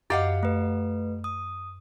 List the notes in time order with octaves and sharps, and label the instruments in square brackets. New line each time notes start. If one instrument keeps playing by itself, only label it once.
[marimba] F#2 D#5 [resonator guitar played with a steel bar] G4 F5 F#5
[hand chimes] A3 B4
D#6